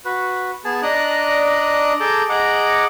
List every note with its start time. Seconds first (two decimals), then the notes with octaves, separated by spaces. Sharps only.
0.05 F#4 B4
0.65 B3 G#4 G#5 A5
0.83 D4 D5 D#5 A#5 D#6 F#6
2.00 G#4 A4 A5 A#5 D6 G6
2.29 G#4 D#5 F#5 A#5 D6